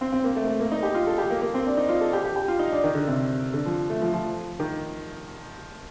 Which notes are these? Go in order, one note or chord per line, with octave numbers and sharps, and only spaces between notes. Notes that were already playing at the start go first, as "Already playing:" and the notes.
C4
C4
A#3
A3
A3
A#3
D#4
G4
F4
A4
G4
A#3
A#3
C4
D4
D#4
F4
A4
G4
G4
G4
F4
D#4
D4
D#3
D3
C3
D3
F3
A3
F3
F3
D#3